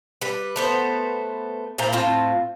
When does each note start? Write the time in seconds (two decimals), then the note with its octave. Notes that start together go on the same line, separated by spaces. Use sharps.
0.21 G3 B4
0.56 A3 B3 C5
1.78 A#2 E4 C5 A#5
1.93 A2 C4 F4 A5